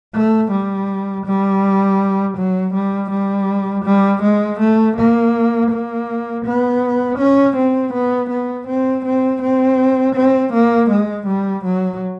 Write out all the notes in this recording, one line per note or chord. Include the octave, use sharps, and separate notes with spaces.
A3
G3
G3
F#3
G3
G3
G3
G#3
A3
A#3
A#3
B3
C#4
C4
B3
B3
C4
C4
C4
C4
A#3
G#3
G3
F#3